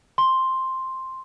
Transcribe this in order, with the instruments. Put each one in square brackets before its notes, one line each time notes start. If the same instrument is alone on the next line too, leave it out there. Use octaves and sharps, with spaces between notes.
[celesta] C6